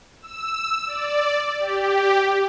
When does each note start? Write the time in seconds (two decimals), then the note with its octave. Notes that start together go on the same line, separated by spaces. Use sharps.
0.22 E6
0.86 D5
1.59 G4